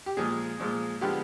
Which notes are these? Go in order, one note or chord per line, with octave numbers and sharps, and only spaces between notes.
G4
A#2 F3 G#3 G#4
A#2 F3 G#3
D3 F3 G#3 B3 G4